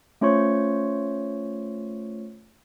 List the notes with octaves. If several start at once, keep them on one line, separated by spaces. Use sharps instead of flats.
A3 C#4 F4 C5 C#5 C#6